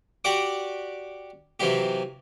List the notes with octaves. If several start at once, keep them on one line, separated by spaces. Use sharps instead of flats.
F#4 G4 D5 F#5 D6
C3 E3 F#3 F4 G4